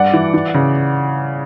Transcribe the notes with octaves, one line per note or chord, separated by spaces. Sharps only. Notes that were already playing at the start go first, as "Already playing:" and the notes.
Already playing: G2 D5 F#5
E3
E3
C#3